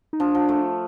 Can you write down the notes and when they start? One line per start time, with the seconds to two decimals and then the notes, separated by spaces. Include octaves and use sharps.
0.13 D#4
0.20 F3 D4
0.35 F3
0.49 A3